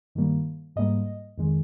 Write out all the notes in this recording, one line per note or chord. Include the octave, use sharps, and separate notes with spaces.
G2 D#3 G3 A#3
G#2 G3 A#3 D#5
F2 D#3 G#3